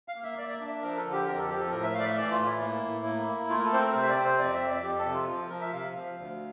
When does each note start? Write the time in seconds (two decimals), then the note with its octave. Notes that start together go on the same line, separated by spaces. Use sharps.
0.08 F5
0.15 A#3
0.23 E5
0.38 A#3 D5
0.49 D5
0.52 E5
0.60 D4
0.68 E5
0.82 F3 A#4
0.97 A4
1.05 D3
1.12 G4
1.27 F2 A#4
1.34 G4
1.38 A4
1.49 F3 G4
1.60 A4
1.71 A2 A#4
1.83 E5
1.93 A3 F5
1.99 D5
2.05 E5
2.16 E3 D5
2.31 F4
2.38 A2
2.46 E4
2.60 A#3
2.83 A2
3.05 A#3
3.27 A#3
3.49 A3 F4
3.59 A#4
3.65 A4
3.73 C4 C5
3.80 A#4
3.94 C3 C5
4.03 E5
4.09 D5
4.17 C4
4.24 C5
4.38 F2 D5
4.54 E5
4.61 F2
4.68 D5
4.83 F2 G4
4.98 A4
5.06 C3
5.13 F4
5.28 F3 F4
5.50 F3 A#4
5.61 E5
5.72 C3 F5
5.95 F3
6.17 D2